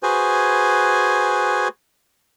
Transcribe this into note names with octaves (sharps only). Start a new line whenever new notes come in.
F#4 G#4 B4 C5 G#5